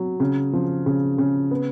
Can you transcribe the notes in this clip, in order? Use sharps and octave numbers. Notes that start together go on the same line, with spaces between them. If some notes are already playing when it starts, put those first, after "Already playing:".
Already playing: F#3
C#3
F3
C#3
C#3
B3